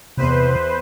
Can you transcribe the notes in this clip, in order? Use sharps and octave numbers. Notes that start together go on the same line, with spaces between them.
E2 C3 B4 C5